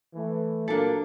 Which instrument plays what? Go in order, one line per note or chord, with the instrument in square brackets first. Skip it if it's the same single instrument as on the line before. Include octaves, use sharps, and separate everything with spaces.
[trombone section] E3 A3
[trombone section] A#2 F#3 A#3 [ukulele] D4 A4